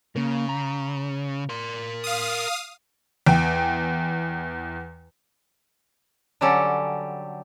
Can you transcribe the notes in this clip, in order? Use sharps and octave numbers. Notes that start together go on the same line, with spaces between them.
C#3 A#3 A#4
A#5
A#4 C6
F5 D#6
E2 G5
D3 F#3 G3 C#4 G4 A4